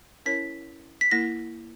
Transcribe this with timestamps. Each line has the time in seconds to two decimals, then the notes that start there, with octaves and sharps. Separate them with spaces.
0.26 C#4 E4 A#4 C#5 B6
1.01 B6
1.11 A#3 E4 A#4 A#6